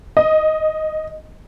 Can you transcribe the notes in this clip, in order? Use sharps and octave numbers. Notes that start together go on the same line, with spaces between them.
D#5